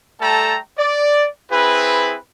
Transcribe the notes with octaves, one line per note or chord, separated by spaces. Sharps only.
G3 A3 A4 G5 A5 A#5
D5
C4 E4 G#4 B4